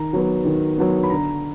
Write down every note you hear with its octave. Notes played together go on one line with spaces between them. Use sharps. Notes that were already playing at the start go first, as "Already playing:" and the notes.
Already playing: D#3 A#5
F#3 B3
D#3
F#3 B3
B5
D3 A#5